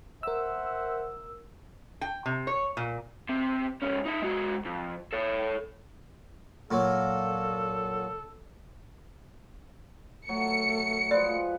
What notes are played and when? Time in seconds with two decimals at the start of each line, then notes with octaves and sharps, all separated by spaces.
0.23 A#4 C5 E5 F#5 E6
2.01 G5
2.26 C3
2.47 C#5
2.77 A#2
3.29 C3
3.82 G#2 C#4
4.06 D#4 E5
4.22 G#3 F#4
4.65 F2
5.13 A4 C#5
6.71 A#2 F#3 A4
10.29 F#3 A3 C#7
11.11 F3 G#3 B4 D5